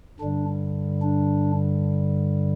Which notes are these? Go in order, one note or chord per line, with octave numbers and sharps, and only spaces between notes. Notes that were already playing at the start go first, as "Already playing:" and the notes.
G2 D3 G3 D4
D4